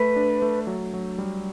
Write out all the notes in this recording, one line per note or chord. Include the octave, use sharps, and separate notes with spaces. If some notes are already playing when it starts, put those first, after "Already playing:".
Already playing: A3 B4
D4
A3
F#3
F#3
G3